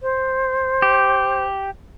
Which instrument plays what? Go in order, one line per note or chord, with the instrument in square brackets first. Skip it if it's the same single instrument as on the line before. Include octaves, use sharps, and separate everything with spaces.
[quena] C5
[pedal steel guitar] G4